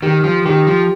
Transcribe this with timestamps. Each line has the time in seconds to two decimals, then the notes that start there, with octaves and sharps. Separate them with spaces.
0.02 D#3 G4
0.24 F3
0.46 D#3 G4
0.67 F3